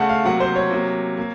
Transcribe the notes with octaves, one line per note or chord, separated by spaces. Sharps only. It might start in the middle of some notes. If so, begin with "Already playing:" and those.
Already playing: C#3 A3 F#5 A5
F5
C3 F#3 A#3 F#5
C5
C#5
C3 F#3 A#3
A#3